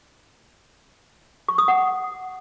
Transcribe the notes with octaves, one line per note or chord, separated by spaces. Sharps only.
C#6
D#6
F#5